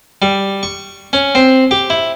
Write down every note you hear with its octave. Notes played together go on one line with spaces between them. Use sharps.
G3
C#6
C#4
C4
G4
E4